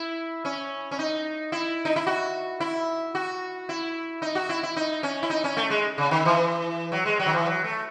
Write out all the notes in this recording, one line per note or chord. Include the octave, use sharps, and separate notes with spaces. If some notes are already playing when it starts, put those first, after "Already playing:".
Already playing: E4
C#4
C#4
D#4
E4
D#4
E4
F#4
E4
F#4
E4
D#4
F#4
E4
E4
D#4
C#4
E4
D#4
C#4
A3
G#3
C#3
D#3
E3
F#3
G#3
F#3
D#3
E3
F#3
A3